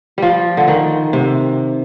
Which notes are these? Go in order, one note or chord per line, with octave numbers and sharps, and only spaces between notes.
F3 G3
D3
D#3
C3